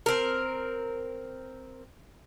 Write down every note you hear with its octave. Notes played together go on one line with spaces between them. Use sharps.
C4 A#4